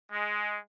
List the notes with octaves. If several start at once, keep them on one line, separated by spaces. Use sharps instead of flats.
G#3